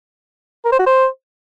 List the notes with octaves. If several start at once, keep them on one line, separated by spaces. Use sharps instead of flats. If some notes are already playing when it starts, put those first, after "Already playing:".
A#4
C5
F#4
C5